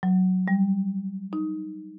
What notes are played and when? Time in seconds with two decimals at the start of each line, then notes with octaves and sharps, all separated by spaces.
0.03 F#3
0.48 G3
1.33 D#4